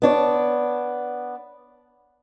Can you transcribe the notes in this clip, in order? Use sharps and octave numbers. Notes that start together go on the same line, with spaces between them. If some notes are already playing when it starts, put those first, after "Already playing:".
B3 D4 C#5